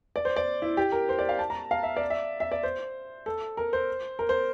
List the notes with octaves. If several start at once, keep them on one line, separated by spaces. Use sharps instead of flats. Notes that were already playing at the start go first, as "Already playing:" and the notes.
D5
C5
D5
E4
G4
A#4
C5
D5
F5
A5
A#5
F5
E5
D5
E5
E5
D5
C5
A4
A#4
C5
A#4
C5